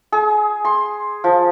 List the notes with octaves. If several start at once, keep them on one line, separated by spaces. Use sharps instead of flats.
G#4
C6
F3